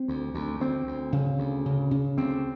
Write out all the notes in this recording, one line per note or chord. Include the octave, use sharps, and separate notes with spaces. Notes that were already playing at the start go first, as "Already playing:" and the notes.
Already playing: C4
D2
D2
D2 C4
D2
C#3
D2
C#3
C#3
D2 C4